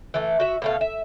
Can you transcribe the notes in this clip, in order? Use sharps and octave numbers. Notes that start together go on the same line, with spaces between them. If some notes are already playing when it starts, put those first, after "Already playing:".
E3 A3
F#4 E5
B2 A3 F5
E5